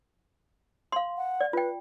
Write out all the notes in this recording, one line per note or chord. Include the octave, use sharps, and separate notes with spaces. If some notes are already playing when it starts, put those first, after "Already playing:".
F5 C6
F#5
D5
F4 B4 G5